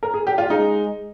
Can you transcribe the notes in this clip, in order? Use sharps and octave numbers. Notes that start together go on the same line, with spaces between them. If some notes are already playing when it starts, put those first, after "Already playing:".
A#4
G#4
G4
F4
G#3 D#4